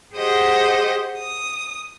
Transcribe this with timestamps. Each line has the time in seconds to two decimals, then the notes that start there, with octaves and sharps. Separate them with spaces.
0.14 G4 G#4 C5 D#5 F#5
1.17 D#6